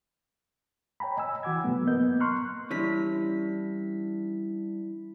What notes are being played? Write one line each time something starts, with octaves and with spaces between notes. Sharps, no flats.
C#5 G5 G#5 A#5 B5
D#5 G#5 E6
E3 F#4 F#5 D6 E6 G#6
G#2 C3 F#3 A3 B3
A#3 B3 D#5 G6
A#5 C6 C#6 F6 F#6
E3 G3 C#4 D4 E4 B6